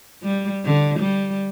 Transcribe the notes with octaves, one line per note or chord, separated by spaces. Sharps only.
G3
D3
G3